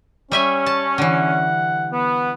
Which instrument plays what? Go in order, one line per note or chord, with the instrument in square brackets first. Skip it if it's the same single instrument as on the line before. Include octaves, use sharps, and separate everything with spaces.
[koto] G3 E5 G#5 [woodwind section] C#4
[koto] A5
[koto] D3 E3 [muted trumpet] F#5
[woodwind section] B3